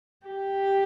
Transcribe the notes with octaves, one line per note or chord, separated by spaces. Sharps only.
G4